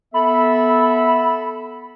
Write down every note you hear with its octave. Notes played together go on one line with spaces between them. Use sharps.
B3 A4 E5 B5